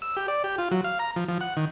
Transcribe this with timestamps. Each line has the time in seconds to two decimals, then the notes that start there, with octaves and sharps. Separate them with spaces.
0.02 E6
0.17 G4
0.28 D5
0.44 G4
0.58 F4
0.71 F#3
0.84 F5
0.99 A#5
1.16 F3
1.28 F3
1.41 F#5
1.57 D#3